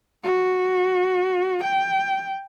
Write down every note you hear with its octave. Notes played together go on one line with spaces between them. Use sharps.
F#4
G5